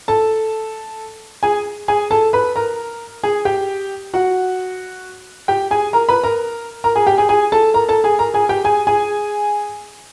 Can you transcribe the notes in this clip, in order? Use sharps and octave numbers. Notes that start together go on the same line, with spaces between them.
A4 A5
G#4 G#5
G#4 G#5
A4 A5
B4 B5
A#4 A#5
G#4 G#5
G4 G5
F#4 F#5
G4 G5
G#4 G#5
A#4 A#5
B4 B5
A#4 A#5
A#4 A#5
G#4 G#5
G4 G5
G#4 G#5
G#4 G#5
A4 A5
A#4 A#5
A4 A5
G#4 G#5
A#4 A#5
G#4 G#5
G4 G5
G#4 G#5
G#4 G#5